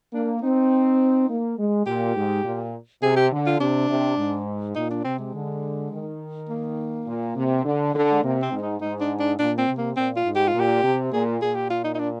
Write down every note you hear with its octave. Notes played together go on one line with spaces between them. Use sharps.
A#3 D4
C4 D#4
A#3
G#3
A#2 G4
G#2
A#2
C3 G#4
G4
D3
F4
C3 D4
C3
G#2
A#2 D#4
D4
C3 C4
G#3
D3
D#3
A#3
A#2
C3
D3
D3
G#3
C3 A#3
C4
G#2
D#4
G#2 D#4
D4
D4
A#2 D4
C4
C3
A#3
A#2 C4
F4
G#2
G4
F4
A#2
G4
C3
A#2 G#4
A#2 G#4
G4
F4
D#4
D#4
D4